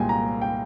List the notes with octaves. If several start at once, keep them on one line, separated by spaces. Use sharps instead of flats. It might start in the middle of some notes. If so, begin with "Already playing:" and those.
Already playing: C2 A#2 G#3 F5 G5 G#5
A#5
G5